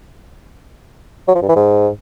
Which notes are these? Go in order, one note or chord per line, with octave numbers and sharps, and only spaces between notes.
F#3
F3
G2
E3
G#2